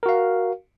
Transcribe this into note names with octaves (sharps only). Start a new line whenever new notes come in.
F#4 A#4 F5